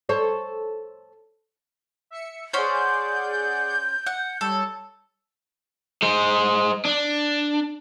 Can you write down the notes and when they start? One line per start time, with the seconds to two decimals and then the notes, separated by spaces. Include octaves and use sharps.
0.09 A4 C5 C#5
2.10 E5 C#7
2.53 C#4 G#4 C5 D5 F#5
2.73 G6
4.06 F#5
4.41 G3 A4 C#5
6.02 G#3 C5
6.85 D4